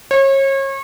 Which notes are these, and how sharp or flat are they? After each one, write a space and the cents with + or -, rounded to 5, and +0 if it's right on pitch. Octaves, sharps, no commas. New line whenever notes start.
C#5 -35